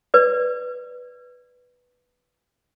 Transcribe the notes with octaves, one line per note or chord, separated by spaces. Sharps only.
B4 D5